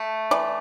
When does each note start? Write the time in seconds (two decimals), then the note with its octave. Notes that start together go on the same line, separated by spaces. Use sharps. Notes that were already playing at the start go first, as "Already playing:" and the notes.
Already playing: A3
0.31 E3 D5